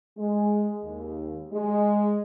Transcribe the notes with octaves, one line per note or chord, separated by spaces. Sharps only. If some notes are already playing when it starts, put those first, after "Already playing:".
G#3
D#2
G#3